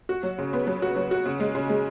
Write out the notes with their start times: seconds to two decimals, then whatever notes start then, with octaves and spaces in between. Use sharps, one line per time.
0.09 F#4
0.23 F#3
0.38 C#3
0.53 B3
0.67 F#3
0.82 F#4
0.96 F#3
1.11 F#4
1.26 C#3
1.40 G#3
1.55 C#3
1.69 G#3